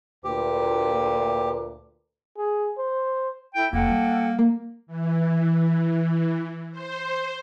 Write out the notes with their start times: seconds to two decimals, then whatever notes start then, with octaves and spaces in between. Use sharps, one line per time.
0.24 D2 A#2 G4 B4
2.38 G#4
2.78 C5
3.55 E4 A4 G5
3.73 F1 A#3 A4 F#5 G5
3.89 G3
4.39 A#3
4.87 E3
6.71 C5